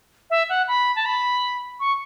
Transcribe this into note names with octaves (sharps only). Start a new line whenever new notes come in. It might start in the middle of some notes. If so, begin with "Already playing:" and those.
E5
F#5
B5
A5
B5
C#6